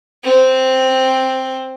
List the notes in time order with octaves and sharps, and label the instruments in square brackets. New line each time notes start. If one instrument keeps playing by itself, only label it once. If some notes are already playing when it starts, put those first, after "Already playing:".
[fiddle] C4